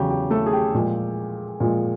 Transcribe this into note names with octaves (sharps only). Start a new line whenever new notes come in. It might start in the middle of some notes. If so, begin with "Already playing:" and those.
Already playing: E2 C#3 F#3 G4
G4
A3 A4
G#4
G4
A#2 F3 G#3
A#2 F3 G#3